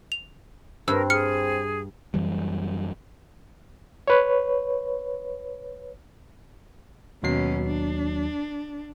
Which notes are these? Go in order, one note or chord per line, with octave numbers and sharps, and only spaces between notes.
F7
G2 C4 A#4 E6
G#4 F6 C#7
F#2 E3 G3
B4 C#5
D#2 B2 F#3 C#4 C7
D4